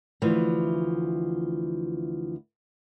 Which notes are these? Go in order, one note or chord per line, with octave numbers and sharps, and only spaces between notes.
D2 E3 F3 B4